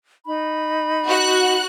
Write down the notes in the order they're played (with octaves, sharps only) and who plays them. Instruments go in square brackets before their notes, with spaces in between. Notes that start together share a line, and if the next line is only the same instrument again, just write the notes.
[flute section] D#4 B5
[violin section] F#4 F#6